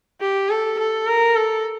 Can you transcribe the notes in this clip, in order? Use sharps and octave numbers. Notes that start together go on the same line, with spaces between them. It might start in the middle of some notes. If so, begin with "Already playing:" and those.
G4
A4
A4
A#4
A4